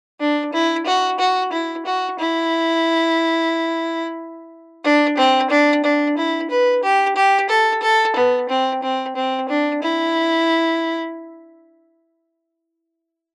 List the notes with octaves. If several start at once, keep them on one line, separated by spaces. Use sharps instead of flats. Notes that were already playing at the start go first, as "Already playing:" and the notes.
D4
E4
F#4
F#4
E4
F#4
E4
D4
C4
D4
D4
E4
B4
G4
G4
A4
A4
B3
C4
C4
C4
D4
E4